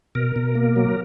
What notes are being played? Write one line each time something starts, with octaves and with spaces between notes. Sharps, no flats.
B2 A#4
B2
A#3
F#3